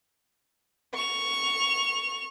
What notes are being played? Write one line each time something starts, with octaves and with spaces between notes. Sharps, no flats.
C#6 F7